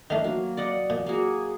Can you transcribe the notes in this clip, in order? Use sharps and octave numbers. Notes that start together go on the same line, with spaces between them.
D#3 A3 D4 F5
F#3 A#3
D5 D#5 F#5
A#2
A#3 F#4 G#4